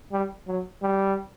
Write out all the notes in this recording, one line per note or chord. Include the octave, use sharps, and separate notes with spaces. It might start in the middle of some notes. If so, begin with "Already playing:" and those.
G3
F#3
G3